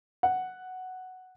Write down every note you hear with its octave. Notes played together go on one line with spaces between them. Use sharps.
F#5